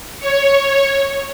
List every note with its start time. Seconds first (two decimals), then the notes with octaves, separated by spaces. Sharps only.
0.19 C#5